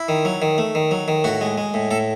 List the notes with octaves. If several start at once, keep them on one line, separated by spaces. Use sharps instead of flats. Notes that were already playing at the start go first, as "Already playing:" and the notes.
Already playing: E4
D#3
F#3
D#3
A3
D#3
F#3
D#3
A2 F#4
G#3
G#3
A2
A2 A4